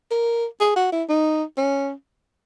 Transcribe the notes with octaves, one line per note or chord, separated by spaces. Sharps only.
A#4
G#4
F#4
E4
D#4
C#4